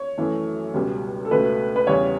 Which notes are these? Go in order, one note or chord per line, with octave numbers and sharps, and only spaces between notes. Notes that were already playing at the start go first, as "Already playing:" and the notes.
Already playing: C#5
F#2 E3 A3
C#2 B2 G3
A4
C#2 B2 A3 B4
B4
E2 C#3 G3 B3 C#5